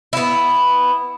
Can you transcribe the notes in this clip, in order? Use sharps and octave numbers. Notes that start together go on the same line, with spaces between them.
B3 E4